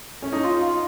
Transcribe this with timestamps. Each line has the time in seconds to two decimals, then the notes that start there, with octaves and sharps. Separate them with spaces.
0.22 C#4
0.32 D#4
0.43 F4 C6
0.62 F5